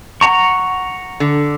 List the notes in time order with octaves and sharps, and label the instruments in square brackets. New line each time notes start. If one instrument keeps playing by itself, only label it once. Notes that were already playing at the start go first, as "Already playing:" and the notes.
[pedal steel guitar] F#5 A#5 C#6
[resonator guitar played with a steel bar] D3